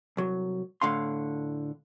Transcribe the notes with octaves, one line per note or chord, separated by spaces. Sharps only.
C2 F#3
A2 D3 F5 C6